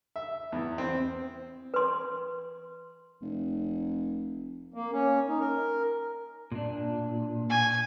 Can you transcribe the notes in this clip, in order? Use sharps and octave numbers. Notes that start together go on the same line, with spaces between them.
E5
E2
C4
B4 C6
F1
A#3
C#4
D#4
A#4
A#2 D4
G#5